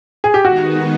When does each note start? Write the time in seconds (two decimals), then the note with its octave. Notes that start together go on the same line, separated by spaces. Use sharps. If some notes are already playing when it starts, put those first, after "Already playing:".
0.24 G#4
0.34 G4
0.44 D#3 G#3 B3 D#4 F#4